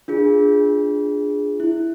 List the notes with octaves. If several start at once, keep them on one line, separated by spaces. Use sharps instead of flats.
D4 F4 G#4
E4